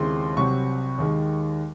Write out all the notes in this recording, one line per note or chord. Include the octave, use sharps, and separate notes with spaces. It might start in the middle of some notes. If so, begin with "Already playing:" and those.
Already playing: D#2 C#3 G#3 C4 E4 C6
C2 C3 F#3 C4 C#6
D#2 D#3 G#3